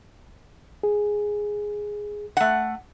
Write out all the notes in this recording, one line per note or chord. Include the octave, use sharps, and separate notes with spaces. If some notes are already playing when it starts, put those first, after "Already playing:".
G#4
A3 F#5